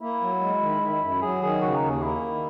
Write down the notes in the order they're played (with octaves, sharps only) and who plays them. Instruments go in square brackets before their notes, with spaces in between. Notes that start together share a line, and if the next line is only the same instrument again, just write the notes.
[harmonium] A#3 [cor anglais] E4
[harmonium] F#3
G#3
D#3
D#3
F#2
[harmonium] F#3 [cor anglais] G#4
[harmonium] D#3 [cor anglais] G#4
[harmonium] C#3 [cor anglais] F#4
[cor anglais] A#4
[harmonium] D#2
[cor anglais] G#4
[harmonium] A#3 [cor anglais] E4
[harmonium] D#3